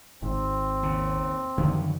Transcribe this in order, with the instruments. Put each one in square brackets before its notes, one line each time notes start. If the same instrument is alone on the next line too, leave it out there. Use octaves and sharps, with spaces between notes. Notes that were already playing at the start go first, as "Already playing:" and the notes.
[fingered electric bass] G#1 [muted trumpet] C4
[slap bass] D#2 C#3
[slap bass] F#2 F3 F#3 [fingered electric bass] D3 D#3